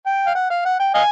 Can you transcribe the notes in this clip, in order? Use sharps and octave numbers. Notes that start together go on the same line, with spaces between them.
G5
F5
F#5
F5
F#5
G5
D#5 F5 G#5